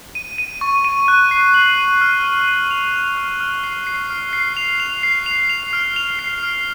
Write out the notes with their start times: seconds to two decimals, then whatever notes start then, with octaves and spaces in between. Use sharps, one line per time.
0.15 D#7
0.38 D#7
0.61 C#6
0.85 D#7
1.08 F#6
1.31 C7
1.54 F#7
1.78 D#7
2.01 F6
2.24 D#7
2.48 D#7
2.71 F7
2.94 F7
3.17 F6
3.40 F6
3.64 C7
3.87 C7
4.10 F6
4.33 C7
4.57 F7
4.80 F7
5.03 C7
5.26 F7
5.49 F7
5.73 F6
5.96 F7
6.19 C7
6.43 F6